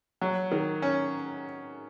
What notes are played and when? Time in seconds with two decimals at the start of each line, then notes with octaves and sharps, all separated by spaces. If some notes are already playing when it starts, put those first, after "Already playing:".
0.21 F#3
0.51 D#3
0.82 C#4